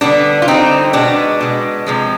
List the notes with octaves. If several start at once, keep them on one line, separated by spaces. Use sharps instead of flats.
D3 G3 B3 D4
F4
D3 G3 C4 D#4
B2 G#3 B3 D4
B2 G#3
C3 F3 G#3